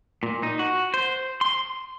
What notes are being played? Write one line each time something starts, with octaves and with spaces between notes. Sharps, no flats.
A#2
D#4
F#4
C5
C6